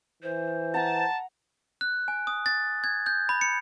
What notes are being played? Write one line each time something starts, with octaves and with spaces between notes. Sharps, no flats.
E3 C5
F#5 A5 A#5
F#6
G#5
D#6
A6
G#6
G6
B5
C#7